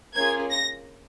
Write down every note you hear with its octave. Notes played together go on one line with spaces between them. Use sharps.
A#3 C#4 F4 G#4 G#6
A#6